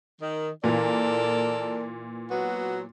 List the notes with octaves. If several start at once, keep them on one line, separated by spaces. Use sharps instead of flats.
D#3
A#2 E3 A4 A#4 D5
F#3 B3 F#4